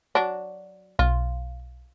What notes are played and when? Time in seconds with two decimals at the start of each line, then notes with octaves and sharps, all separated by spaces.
0.15 F#3 D4
0.99 B1 F4